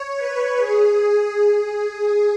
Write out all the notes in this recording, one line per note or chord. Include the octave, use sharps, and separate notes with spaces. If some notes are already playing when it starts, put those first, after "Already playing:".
Already playing: C#5
B4
G#4
G#4